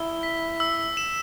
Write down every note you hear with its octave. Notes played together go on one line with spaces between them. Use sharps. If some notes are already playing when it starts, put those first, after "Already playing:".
Already playing: E4 G7
B6
E6
E7